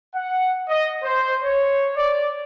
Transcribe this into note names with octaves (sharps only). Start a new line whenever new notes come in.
F#5
D#5
C5
C#5
D5